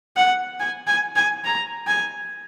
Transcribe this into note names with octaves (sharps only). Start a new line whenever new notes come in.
F#5
G#5
G#5
G#5
A#5
G#5